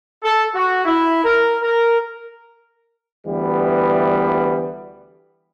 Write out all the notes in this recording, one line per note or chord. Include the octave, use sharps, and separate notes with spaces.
A4
F#4
E4
A#4
A#4
D2 E3 G3 B3